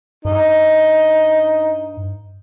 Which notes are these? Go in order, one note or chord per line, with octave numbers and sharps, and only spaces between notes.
G2 D#4